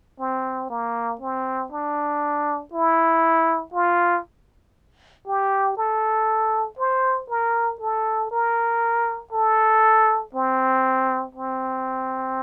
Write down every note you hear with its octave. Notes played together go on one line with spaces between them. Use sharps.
C4
A#3
C4
D4
E4
F4
G4
A4
C5
A#4
A4
A#4
A4
C4
C4